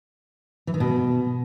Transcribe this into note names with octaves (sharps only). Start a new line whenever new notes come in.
E3
D#3
B2